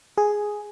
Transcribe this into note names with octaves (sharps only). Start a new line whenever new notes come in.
G#4